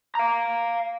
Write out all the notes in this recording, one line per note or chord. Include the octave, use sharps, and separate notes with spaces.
F5 A#5